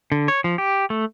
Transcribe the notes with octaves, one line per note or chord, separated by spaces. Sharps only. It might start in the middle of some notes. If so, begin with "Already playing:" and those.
D3
C#5
F3
G4
A3